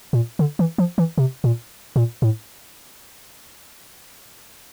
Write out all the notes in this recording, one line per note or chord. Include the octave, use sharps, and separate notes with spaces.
A#2
D3
E3
F3
E3
C3
A#2
A#2
A2